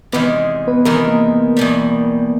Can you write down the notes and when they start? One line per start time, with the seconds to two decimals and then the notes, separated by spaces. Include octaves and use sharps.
0.12 E2 C3 D#3 G#3 B3 B4
0.67 B3 B4
0.85 E2 C3 D#3 G#3 A#4
0.96 B4
1.08 A#3 A#4
1.57 E2 B2 G3